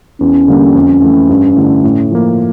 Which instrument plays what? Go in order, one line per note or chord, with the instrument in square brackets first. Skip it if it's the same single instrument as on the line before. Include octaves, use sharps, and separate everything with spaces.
[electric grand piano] E2 [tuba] C#4
[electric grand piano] D3 G3 A#3
F2
E3 A3
G2
D3 A3 E4
A2
F3 A#3